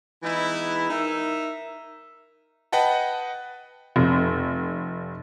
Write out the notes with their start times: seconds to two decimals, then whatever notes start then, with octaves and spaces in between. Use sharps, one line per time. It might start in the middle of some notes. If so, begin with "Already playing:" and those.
0.23 E3 G#3 B3 D#4 E4
0.90 D#4 A#4 E5
2.72 B4 D#5 F#5 G5 A5
3.96 F1